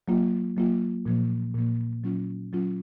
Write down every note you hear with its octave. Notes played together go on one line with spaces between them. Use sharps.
F#3 A#3 F4
F#3 A#3 F4
A#2 F3 A#3
A#2 F3 A#3
F#3 C#4 F4
F#3 C#4 F4